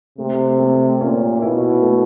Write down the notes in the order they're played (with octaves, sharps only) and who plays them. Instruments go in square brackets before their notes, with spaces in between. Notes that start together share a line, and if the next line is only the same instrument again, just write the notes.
[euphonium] C3 [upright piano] A3
[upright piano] A3
[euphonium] A#2 [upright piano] C#4
[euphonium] B2 [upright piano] E4
[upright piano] A3